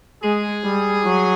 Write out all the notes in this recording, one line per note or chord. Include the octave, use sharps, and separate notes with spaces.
G#3 G#4
G3
F#3